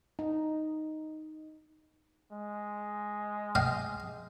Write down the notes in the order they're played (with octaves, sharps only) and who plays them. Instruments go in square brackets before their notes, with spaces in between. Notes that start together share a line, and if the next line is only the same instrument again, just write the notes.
[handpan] D#4
[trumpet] G#3
[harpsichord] D#5 F5 G5